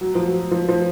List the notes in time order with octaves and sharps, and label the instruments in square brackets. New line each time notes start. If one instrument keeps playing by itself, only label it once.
[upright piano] F#3
F3
F#3
F3
F3